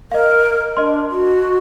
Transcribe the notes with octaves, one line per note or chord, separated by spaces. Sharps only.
A#4 D#5 F5
D4 D#5 C6
F#4